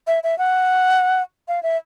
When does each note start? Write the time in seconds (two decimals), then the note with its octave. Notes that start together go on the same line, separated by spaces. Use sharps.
0.07 E5
0.23 E5
0.38 F#5
1.48 F5
1.63 E5